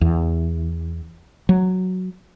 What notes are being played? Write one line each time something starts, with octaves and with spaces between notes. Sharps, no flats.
E2
F#3